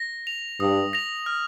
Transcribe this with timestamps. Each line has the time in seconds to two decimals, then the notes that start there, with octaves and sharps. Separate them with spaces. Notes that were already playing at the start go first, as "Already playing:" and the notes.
Already playing: A#6
0.27 F7
0.60 G2 D#6
0.93 A#6 F7
1.26 F6